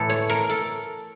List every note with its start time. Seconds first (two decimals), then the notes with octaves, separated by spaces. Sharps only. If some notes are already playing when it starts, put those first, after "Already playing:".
Already playing: A2 E3 A4
0.10 C#5
0.30 A#4
0.50 A4